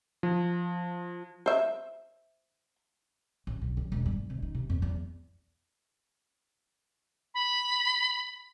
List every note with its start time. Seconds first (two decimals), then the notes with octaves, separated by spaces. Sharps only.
0.23 F3
1.46 C5 E5
3.47 A1
3.62 B1
3.77 C#3
3.92 E1
4.06 G2
4.30 C3
4.42 D#4
4.55 C3
4.70 F2
4.82 E2
7.34 B5